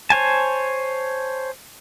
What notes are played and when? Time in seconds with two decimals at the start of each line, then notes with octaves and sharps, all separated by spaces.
0.10 C5 C#5 G#5 A5